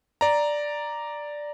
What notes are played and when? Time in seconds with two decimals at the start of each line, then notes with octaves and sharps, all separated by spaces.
0.21 D5 A#5